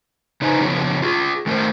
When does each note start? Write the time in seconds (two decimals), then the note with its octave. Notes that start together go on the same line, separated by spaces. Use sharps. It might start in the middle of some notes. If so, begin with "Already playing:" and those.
0.41 C#3 D#4 B4 C5 D#5 G#5
0.60 C#3 F3 B3 D4 G4 C#5
1.02 F4 G#4
1.46 D#3 A3 G#4 A#4 C5